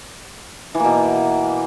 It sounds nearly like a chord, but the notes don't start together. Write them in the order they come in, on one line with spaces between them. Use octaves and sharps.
E3 A#3 B2